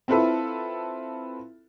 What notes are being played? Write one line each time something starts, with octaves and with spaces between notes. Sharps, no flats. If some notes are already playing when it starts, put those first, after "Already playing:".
C4 E4 F4 A4 B4 E5